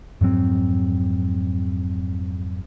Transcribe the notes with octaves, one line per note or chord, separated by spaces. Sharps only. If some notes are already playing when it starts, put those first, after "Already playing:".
F2 G#2 F#3 C4